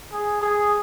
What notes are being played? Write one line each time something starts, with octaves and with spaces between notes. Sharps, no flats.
G#4
G#4